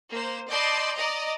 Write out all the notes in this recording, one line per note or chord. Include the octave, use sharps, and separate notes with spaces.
A#3 C5
D5 D#5 A5 B5 C6 G6
D5 D#5 A#5